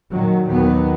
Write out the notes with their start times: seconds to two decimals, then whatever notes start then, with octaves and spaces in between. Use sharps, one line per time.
0.10 A#2 D#3 F#3
0.48 D#2 D#3 F#3 B3